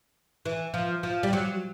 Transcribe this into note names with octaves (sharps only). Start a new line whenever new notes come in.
E3
F3
F3
G3
F#3